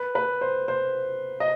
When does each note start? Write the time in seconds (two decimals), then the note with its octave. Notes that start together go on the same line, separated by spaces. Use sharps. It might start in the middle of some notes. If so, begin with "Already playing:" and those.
Already playing: B4
0.15 B4
0.41 C5
0.68 C5
1.40 D#5